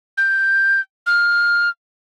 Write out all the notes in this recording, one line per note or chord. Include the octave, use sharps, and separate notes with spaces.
G6
F6